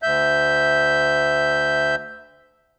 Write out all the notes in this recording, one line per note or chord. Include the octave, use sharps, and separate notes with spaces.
D2 E5 G6